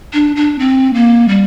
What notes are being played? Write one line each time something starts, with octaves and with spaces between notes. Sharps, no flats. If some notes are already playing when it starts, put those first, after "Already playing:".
D4
D4
C4
A#3
G3